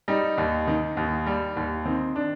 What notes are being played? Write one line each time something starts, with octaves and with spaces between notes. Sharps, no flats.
G3 D#4
D#2
D#3
D#2
G3
D#2
D#3 C4
D4